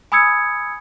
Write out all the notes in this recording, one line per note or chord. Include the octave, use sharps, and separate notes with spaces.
G#5 B5 D#6 E6 G#6 C#7